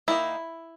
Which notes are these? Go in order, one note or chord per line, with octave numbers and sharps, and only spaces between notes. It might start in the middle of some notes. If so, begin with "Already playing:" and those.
D#3 A#3 D#4 E4